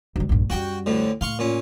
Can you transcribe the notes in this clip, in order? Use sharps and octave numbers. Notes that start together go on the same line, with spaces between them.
D2 G3
A#1 G2
F#2 G3 F#4 G5
D2 A2 D3
A2 F5 C6 C#6
A#2 C#4